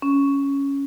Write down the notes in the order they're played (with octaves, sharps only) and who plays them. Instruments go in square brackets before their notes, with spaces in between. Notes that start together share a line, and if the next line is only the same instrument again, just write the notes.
[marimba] C#4